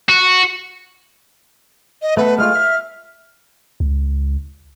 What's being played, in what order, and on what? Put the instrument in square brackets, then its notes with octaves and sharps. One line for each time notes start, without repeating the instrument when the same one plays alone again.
[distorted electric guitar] F#4
[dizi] D#5
[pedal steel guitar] A3 B3 A4 [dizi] B4
[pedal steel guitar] G#3 A3 F4 [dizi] F6
[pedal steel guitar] E5
[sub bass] C#2